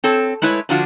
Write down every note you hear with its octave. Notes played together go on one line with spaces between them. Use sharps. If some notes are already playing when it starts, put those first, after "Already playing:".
C4 A4 C#5 A5
G#3 A3 E4 B4 C#5
D3 F3 D4 F4 F#4